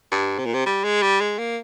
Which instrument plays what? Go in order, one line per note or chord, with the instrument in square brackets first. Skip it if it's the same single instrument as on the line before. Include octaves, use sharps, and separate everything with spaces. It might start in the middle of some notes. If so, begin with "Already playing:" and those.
[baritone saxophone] G2
C3
A#2
C3
G3
G#3
G3
G#3
A#3